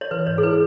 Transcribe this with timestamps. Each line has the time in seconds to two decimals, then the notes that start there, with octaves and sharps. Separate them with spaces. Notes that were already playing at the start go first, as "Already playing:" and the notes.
0.01 C#5
0.11 E3 B4
0.27 G#2 C#5
0.38 G#4
0.43 E4 B4